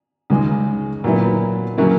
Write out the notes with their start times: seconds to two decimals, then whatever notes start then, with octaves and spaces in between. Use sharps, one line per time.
0.30 C#2 C#3 G#3 D#4
1.04 A#2 F#3 B3 E4
1.78 C#3 F#3 A#3 C#4 E4